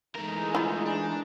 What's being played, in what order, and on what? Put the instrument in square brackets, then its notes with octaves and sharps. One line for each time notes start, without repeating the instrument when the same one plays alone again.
[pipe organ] E3 G#3 D#4 [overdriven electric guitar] A3 A#4
[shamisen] E4 F4
[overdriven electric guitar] D4